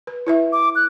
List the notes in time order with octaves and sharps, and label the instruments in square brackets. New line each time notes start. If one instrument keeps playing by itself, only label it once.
[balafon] B4
E4 B4 E5
[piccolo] D6
F#6